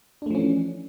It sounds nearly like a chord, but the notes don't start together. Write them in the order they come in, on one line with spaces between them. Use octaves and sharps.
D4 A3 F3 C#4 E3